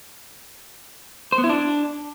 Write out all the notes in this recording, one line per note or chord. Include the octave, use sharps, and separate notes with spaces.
C5
B3
E4
D4